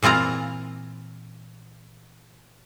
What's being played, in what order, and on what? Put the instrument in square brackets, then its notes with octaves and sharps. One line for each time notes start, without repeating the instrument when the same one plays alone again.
[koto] A#2 E3 C4 F4 A#5